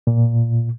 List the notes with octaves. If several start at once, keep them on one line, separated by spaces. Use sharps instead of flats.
A#2